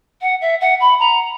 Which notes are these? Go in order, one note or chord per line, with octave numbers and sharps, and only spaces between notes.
F#5
E5
F#5
B5
A#5